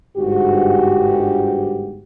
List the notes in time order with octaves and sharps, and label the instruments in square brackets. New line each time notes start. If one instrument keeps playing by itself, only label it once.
[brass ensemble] G1 G#2 F#4 G4